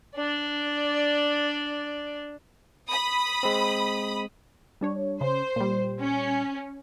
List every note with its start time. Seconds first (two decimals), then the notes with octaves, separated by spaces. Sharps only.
0.15 D4 D5
2.89 B5 D#6
3.43 G#3 C4
4.81 G3 D4 C#5
5.21 C#3 C5
5.56 A#2 G3
6.00 C#4